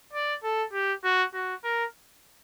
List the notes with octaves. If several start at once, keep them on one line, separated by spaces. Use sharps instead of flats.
D5
A4
G4
F#4
F#4
A#4